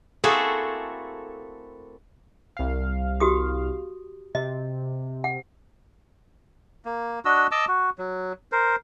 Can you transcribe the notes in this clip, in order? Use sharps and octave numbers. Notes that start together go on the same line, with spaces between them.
A3 A#3 C4 E4 F#4 G#4 A4
C2 F5
F#4 G4 D#6
C3 D#5
F#5
A#3
D4 F#4 D#5 E6
D#5 A5 D6 E6
F#4
F#3
A#4 C5